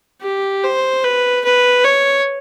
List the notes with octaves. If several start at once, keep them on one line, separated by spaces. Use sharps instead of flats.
G4
C5
B4
B4
C#5